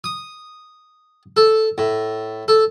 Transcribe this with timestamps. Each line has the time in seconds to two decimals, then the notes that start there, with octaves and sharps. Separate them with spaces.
0.04 D#6
1.37 A4
1.78 A2
2.48 A4